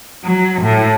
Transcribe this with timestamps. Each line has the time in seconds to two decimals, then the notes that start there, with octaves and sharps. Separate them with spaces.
0.24 F#3
0.62 A2